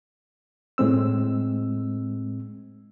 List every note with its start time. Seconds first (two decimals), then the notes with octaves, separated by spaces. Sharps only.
0.78 A2 G#3 C4 E6